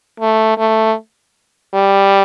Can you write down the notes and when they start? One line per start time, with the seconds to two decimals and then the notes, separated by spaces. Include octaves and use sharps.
0.20 A3
0.58 A3
1.74 G3